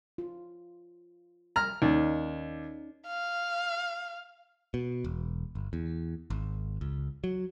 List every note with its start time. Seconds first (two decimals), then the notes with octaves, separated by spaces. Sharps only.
0.18 F4
1.56 A#5 F6
1.82 D#2 C#4 D#4 D5
3.07 F5
4.74 B2
5.04 E1
5.55 G1
5.73 E2
6.30 G#1
6.81 C#2
7.24 F#3